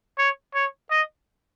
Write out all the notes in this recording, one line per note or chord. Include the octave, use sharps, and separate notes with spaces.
C#5
C#5
D#5